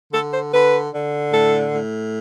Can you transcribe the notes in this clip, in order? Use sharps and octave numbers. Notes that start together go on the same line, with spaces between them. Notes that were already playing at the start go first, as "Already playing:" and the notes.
D3 A4
C5
D3 B4
D3
A2 A4
A2